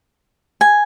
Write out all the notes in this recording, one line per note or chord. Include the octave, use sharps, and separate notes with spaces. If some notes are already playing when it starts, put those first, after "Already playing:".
G#5